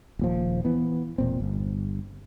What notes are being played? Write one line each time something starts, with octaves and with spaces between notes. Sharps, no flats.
D#1 A#2 F3
E3 B3
E1 A#2 C4
G1